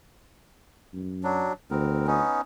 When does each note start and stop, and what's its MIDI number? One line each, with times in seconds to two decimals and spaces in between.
0.93 1.47 42
1.24 1.53 54
1.24 1.53 62
1.71 2.22 38
1.71 2.07 59
1.71 2.07 60
1.71 2.07 70
2.07 2.41 59
2.07 2.41 61
2.07 2.41 63